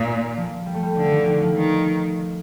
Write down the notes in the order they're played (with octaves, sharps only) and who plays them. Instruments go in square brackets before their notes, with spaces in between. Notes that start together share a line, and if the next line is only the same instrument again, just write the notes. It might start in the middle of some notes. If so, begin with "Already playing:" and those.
Already playing: [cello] A#2 [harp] D#3
[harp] F3
G3
A3
G3
[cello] D3 [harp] F3
[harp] D#3
D#3
F3
[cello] D#3